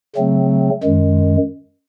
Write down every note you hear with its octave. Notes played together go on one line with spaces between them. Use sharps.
C#3 F#3 A3 C4
F#2 D#3 G#3